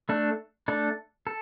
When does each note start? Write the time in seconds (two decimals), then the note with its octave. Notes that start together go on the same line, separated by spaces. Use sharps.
0.09 A3 D4 A4
0.68 A3 D4 A4
1.27 A4